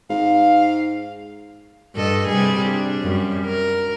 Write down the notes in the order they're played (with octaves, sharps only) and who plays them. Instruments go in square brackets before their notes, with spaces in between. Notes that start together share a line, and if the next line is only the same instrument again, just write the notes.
[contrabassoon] G#2 [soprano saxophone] F5
[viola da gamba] G2 A4 D#5
C3 G3 G#4
D4
F#2 G3
A#4